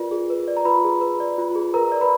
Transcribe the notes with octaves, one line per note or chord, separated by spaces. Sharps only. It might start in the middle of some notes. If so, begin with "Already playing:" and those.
Already playing: F4 A#4 B4 D5
G#4
B4
D5
A#5
F4 B4 B5
G#4
B4
D5
F4
G#4
A#4 B4 A#5
D5
B4 B5